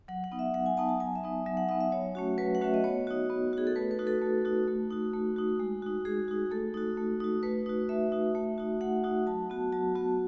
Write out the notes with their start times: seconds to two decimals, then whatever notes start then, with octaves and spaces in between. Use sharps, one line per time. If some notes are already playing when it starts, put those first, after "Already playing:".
0.08 F#3 F#5
0.24 F#5
0.32 B3 D#4
0.39 E5
0.54 F#3 F#5
0.66 G#5
0.77 B3 D#4 A5
0.89 A5
1.00 F#3 G#5
1.15 E5
1.24 B3 D#4
1.46 F#3 E5
1.57 F#5
1.69 B3 D#4 E5
1.81 E5
1.92 F#3 C#5
2.15 A3 C#4 F#4
2.38 F#3 B4
2.55 F#5
2.61 A3 C#4 F#4 E5
2.74 D#5
2.84 B3 C#5
3.07 D#4 F#4
3.30 B3
3.53 D#4 F#4 G#4
3.67 A4
3.76 A3 B4
3.91 B4
3.99 D#4 F#4
4.07 A4
4.22 A3
4.45 D#4 F#4
4.68 A3
4.91 D#4 F#4
5.14 A3
5.36 D#4 F#4
5.60 G#3
5.82 D#4 F#4
6.05 G#3 G#4
6.28 D#4 F#4
6.51 A3 A4
6.74 D#4 F#4
6.97 A3
7.20 D#4 F#4
7.43 A3 B4
7.66 D#4 F#4
7.89 A3 E5
8.12 D#4 F#4
8.35 A3
8.58 D#4 F#4
8.81 A3 F#5
9.04 D#4 F#4
9.27 F#3 A5
9.50 B3 F#4
9.73 F#3 A5
9.95 B3 F#4